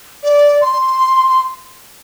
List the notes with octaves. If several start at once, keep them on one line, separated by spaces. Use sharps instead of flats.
D5
C6
C6